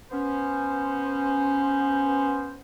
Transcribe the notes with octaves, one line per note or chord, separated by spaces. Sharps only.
B3 C#4 C5